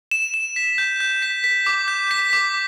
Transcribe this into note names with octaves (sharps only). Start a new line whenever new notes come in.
E7
E7
B6
G6
G6
B6
B6
D6
G6
B6
D6